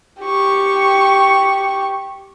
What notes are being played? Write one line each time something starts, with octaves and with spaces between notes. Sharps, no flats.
G4 C#6